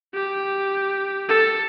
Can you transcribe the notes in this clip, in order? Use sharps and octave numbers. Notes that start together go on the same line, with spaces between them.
G4
A4